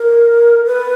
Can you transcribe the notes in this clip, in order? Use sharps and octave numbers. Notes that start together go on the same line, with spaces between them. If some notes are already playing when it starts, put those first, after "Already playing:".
Already playing: A#4
B4